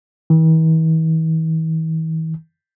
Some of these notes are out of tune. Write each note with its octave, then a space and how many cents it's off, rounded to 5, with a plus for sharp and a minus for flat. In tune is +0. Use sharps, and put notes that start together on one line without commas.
E3 -45